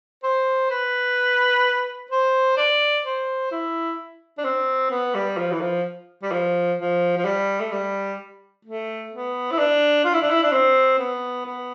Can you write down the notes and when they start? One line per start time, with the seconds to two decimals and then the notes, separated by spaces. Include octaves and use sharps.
0.23 C5
0.70 B4
2.11 C5
2.57 D5
3.05 C5
3.51 E4
4.38 D4
4.44 C4
4.90 B3
5.15 G3
5.37 F3
5.52 E3
5.61 F3
6.22 G3
6.31 F3
6.79 F3
7.17 F3
7.25 G3
7.60 A3
7.72 G3
8.65 A3
9.12 B3
9.51 E4
9.58 D4
10.05 F4
10.13 E4
10.22 D4
10.30 E4
10.43 D4
10.52 C4
10.99 B3
11.46 B3